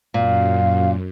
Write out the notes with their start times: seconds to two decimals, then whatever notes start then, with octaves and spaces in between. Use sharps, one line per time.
0.14 F#2 A#2 F5